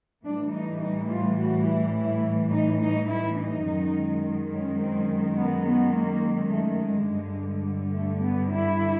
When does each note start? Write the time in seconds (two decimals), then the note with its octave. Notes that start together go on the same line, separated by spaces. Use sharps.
0.24 A2 E3 G3 D4
0.52 D#4
0.81 D#4
1.10 F4
1.38 F#4
1.66 E4
1.94 E4
2.51 D#4
2.81 D#4
3.09 E4
3.37 D#4
3.65 F#2 D#3 G#3
4.51 C#4
4.79 C4
5.35 B3
5.64 B3
5.92 A#3
6.50 A3
6.78 G#3
7.06 G2 D3 G3
7.92 A3
8.20 B3
8.48 E4